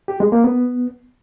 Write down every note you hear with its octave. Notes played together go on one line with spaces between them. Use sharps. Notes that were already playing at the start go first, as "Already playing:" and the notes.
G4
G#3
A#3
B3